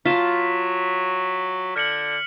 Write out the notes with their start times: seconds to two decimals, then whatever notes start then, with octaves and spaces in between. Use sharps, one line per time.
0.06 F#3 F4 A5 B6 E7
1.76 D3 F6 C#7 F#7